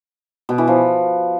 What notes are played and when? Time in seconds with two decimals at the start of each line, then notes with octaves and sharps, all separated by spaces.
0.49 B2
0.58 E3
0.68 F3